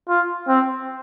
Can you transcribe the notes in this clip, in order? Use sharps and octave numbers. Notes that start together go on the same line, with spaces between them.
F4
C4